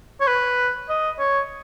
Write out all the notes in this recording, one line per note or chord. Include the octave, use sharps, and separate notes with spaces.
C#5
B4
D#5
C#5